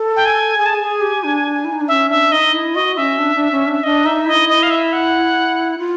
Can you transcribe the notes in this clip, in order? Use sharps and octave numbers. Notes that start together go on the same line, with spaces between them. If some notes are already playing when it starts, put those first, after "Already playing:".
Already playing: A4
G5
G#5
G#4 G#5
A5
G#5
G#4
G4
D4
E4
D#4
D4
C#4 E5
D4 E5
D#4 D#5
D#4
E4
F#4 D#5
C#4 E5
D4
D4
C#4
D4
E5
D4 D#5
D#4 E5
E4 D#5
D#5
F5
E5
F#5
F4